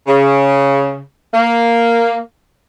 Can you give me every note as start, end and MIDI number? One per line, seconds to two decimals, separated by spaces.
0.08 0.98 49
1.33 2.16 58